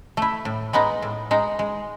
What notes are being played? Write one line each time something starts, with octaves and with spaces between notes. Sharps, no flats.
A3 E4
A2
G#3 B3 D#4
A2
G#3 D#4
G#3